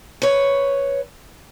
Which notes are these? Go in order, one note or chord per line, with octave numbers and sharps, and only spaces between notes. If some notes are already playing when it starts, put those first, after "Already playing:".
B4 C#5